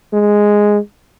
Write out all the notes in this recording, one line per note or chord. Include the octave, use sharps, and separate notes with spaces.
G#3